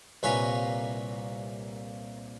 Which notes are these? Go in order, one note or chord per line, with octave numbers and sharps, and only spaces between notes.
C2 A#2 A#3 B4 C#5 G#5